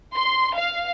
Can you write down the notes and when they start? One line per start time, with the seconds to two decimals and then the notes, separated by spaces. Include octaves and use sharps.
0.16 C6
0.57 F5